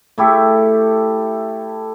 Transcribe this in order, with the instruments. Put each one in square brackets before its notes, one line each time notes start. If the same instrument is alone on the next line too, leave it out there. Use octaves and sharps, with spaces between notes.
[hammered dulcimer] A3 E4 G4 A4